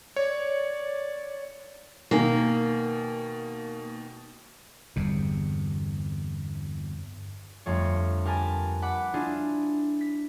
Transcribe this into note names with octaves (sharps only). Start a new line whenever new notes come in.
C#5 D5
B2 D#3 A#3 G#5
G1 E2 C3
G1 F2 A3 C#5
G4 A#4 B4 G#5 A5
F#5 B5 D6
D4 E4 F4 G#4
B6